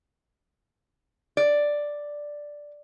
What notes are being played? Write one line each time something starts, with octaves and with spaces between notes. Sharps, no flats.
D5